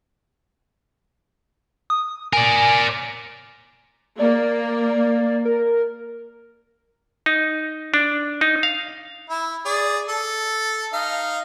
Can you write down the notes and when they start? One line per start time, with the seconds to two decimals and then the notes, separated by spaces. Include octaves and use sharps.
1.90 D#6
2.33 A#4 D5 G#5
4.19 A#3 D5
5.45 A#4
7.26 D#4
7.94 D4
8.41 D#4
8.63 F5
9.30 E4
9.65 G#4 D5
10.09 A4
10.93 D#4 F5